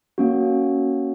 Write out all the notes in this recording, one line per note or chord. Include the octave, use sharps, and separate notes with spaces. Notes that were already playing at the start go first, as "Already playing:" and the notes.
A#3 C#4 F#4